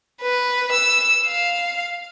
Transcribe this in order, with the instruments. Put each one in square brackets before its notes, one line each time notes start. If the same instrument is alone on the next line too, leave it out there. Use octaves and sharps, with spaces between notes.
[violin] B4
E6
F5